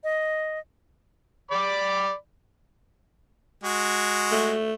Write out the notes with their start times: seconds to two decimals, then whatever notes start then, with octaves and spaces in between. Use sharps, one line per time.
0.04 D#5
1.51 D5 B5 D6
3.64 G#3 F#4
4.31 A3